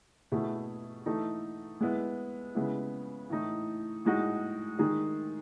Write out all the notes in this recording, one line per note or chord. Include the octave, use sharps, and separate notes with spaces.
B2 A3 E4 G#4
E3 A3 D#4 A4
G#3 B3 E4
C#3 G#3 B3 E4
A2 E3 A3 D#4
A2 G#3 D#4 F#4
D#3 G#3 D#4 G#4